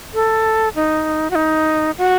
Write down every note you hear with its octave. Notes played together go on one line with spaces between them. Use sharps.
A4
D#4
F#4
D#4
F#4